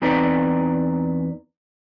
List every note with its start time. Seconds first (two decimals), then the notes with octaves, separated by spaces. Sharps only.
0.02 E2 C4 D#4 B4 D5 A#5